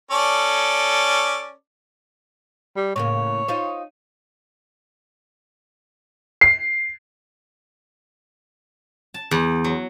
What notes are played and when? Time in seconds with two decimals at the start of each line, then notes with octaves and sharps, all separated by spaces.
0.11 C#4 A4 D5
2.76 G3
2.96 A2 C#3 A#3 C#5
3.48 D#4 F4 C5
6.41 C7
9.14 A5
9.31 E2
9.64 F#3